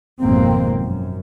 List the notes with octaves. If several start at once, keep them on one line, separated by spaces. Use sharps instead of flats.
G#1 F2 B2 A#3 C4
F#2